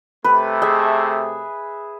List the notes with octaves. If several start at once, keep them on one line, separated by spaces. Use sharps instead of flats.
C3 A3 B4
G#4 E5